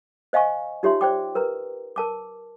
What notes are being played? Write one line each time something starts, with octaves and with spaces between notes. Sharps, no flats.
C5 D#5 F5 G#5 C#6
D#4 F4 G4 C#5 E5 C6
C5 D5 G5 D6
A#4 B4 A#5
A#4 A5 D6